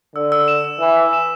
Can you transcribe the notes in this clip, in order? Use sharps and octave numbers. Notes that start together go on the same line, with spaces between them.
D3 E6
E6
E7
E7
E3 E7
B6
E7